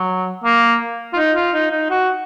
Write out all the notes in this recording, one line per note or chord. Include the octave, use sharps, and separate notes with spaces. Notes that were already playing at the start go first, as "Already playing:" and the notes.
Already playing: F#3
A#3
F4
D#4
F4
D#4
D#4
F#4